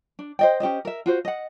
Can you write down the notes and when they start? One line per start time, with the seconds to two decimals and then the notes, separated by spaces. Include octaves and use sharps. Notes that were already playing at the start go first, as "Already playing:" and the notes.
0.19 D4
0.39 C5 D#5 G5
0.60 C#4 G4 C5 D#5
0.85 A#4 E5
1.06 F4 F#4 C5
1.25 D#5 F#5